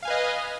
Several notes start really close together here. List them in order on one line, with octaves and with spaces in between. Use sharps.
F5 G#5 B4 D#5